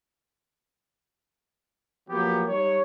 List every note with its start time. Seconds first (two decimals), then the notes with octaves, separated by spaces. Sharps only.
2.10 F3 F#3 A#3 B3 G4
2.48 G3 D#4 C#5